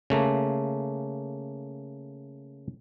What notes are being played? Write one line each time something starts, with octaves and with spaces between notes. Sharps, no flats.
C#3 A3 A#3